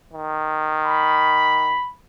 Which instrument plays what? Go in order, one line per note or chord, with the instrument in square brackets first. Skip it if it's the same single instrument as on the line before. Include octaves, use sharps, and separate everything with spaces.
[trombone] D#3
[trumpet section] B5